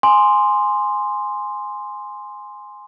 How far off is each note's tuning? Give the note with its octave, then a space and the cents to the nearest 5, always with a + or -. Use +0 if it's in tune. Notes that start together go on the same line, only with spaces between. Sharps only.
G#5 +0 C6 +0 D#6 -40